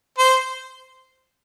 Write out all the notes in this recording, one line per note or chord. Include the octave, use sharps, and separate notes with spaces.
C5